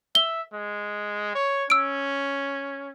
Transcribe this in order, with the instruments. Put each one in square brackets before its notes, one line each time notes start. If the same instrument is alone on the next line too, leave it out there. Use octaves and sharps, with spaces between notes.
[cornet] E5 [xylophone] G7
[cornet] G#3
C#5
[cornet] C#4 [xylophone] E6 D7